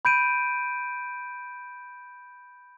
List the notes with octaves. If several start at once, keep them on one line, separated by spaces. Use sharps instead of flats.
B5 G6 D7 D#7